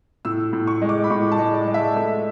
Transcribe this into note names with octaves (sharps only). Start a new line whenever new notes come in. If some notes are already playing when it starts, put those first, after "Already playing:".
A2 E6
A2
C#6
G#3
D6
B5
A2 C#6
A5
G#3
D5
G#3
E5
A3